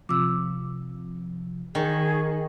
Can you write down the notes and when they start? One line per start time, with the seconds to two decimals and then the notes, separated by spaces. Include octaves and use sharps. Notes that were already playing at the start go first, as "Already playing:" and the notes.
0.09 C3 F3 D6 E6
1.75 D#3 G#4 G5 G#5 C#6